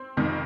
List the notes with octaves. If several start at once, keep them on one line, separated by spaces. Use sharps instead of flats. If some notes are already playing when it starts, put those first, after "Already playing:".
Already playing: C4
F1 F2 D#3